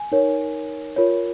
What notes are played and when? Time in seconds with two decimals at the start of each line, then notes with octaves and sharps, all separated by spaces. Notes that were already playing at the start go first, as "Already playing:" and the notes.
Already playing: G#5
0.12 D#4 A#4 C#5
0.96 F4 A#4 C#5